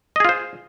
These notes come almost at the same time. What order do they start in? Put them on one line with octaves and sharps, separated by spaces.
D#5 G#4 F4 C5